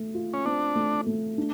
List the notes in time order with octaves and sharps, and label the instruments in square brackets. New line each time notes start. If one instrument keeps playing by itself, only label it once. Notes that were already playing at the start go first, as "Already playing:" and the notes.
Already playing: [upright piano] A3
F4
[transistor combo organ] C#4
[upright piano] C4 [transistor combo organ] D4
[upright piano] A3
A3
D4